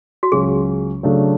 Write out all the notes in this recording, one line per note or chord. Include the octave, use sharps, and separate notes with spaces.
F#4
C#2 C#3 F#3 C#4 G#4
C#3 F#3 A3 D4